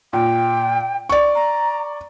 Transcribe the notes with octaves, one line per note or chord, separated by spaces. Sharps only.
A#2 G5
D5 C#6
A#5